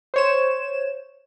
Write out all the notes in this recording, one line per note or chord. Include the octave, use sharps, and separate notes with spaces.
C5 C#5 E7